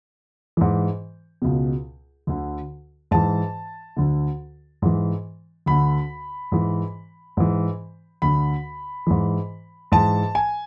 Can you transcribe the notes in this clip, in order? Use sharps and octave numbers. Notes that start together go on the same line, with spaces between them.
G#2 E3
C#2 B2
D2 D3
G#2 E3 A5
D2 D3
G#2 E3
D2 D3 B5
G#2 E3
G#2 E3
D2 D3 B5
G#2 E3
G#2 E3 A5
G#5